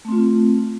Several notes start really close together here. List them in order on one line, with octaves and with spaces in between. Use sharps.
A3 C4 F4